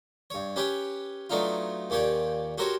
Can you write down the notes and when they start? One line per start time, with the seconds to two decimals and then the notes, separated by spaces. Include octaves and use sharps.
0.30 G2 C#5
0.56 C#4 G4 B4 C#5 G5
1.30 F#3 A3 B3 D4 D#4 F4
1.90 D#2 A#2 G4 C#5 D5
2.58 F#4 G4 A4 A#4 C5 C#5